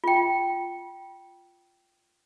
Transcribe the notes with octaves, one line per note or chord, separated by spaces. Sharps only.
F4 G5